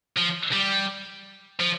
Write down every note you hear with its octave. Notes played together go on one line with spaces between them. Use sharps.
F3
G3
F3